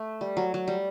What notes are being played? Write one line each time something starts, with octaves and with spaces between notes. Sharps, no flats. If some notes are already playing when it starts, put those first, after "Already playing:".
Already playing: A3
G3
F#3
F#3
G3